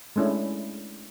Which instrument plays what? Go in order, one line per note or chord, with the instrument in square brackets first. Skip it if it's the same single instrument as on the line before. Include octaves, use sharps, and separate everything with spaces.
[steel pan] G#3 A3 C#4 D4 E4